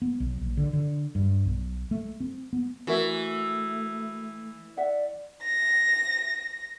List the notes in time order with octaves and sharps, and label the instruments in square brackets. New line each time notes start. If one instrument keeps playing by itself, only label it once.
[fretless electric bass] B3
B1
A#1
D3
D3
G2
B1
A3
C4
B3
[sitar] E3 [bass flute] A3 [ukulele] F#4 A#4 E5
[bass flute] D5 [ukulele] E5 F#5
[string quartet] A#6